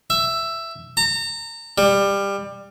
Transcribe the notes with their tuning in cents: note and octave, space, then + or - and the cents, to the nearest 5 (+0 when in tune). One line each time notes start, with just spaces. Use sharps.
E5 +10
A#5 -35
G3 +20